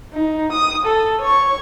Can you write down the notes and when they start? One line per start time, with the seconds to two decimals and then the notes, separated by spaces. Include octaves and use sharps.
0.14 D#4
0.52 D#6
0.85 A4
1.21 C#5 C#6